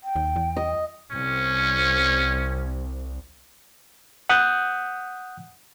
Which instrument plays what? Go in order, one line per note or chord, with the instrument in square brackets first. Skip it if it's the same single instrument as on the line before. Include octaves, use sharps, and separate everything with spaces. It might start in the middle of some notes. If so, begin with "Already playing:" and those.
[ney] G5
[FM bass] D#2
E2
[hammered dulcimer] D#5
[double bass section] C2 [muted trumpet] C#4
[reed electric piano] F#5 D#6 F#6 G6